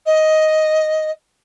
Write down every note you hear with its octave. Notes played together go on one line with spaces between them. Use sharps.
D#5